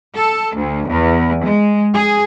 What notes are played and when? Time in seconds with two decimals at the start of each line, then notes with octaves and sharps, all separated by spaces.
0.16 A4
0.55 D2
0.88 E2
1.43 G#3
1.93 G#4